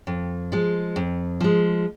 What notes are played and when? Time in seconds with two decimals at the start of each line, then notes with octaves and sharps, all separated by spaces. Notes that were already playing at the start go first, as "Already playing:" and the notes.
0.07 F2
0.52 F3 G#3
0.96 F2
1.40 F3 G#3